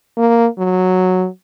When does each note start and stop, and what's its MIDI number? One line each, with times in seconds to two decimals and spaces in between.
0.17 0.47 58
0.59 1.27 54